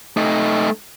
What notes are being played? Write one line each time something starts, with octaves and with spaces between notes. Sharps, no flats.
A3 D#4